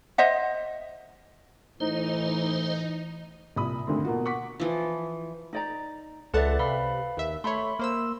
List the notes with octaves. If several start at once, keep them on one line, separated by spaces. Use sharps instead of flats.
C5 D#5 E5 F#5
A2 E3 D#4 C5
C2 A#2 B5 D#6
D2 G2 D#3 A3 C4
B2 A#3 F4 F#4
F#5 C#6 D6 B6
E3 F3
D#4 D5 A#5
C#2 A4 B4 D5 E5 F#5 A5
C3 B4 F5 B5
D#2 E5
A3 C#5 E5 B5 C6
A#3 C5 E6